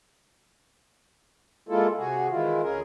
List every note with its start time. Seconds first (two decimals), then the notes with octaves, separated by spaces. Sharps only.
1.69 G#3 A#3 E4 F4 A4
1.98 C3 F#4 G#4
2.30 D#3 E3 G#3 E4 F4
2.63 D2 C#4 G#4 A#4